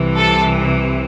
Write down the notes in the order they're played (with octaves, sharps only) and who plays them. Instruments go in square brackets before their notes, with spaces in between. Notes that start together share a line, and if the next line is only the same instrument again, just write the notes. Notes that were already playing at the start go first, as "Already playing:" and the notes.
Already playing: [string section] C2 C3 E3
A4